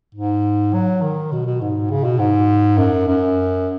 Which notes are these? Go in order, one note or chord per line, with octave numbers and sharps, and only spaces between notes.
G#2
F#3
D#3
B2
B2
G#2
C#3
B2
G#2
F#2
F#2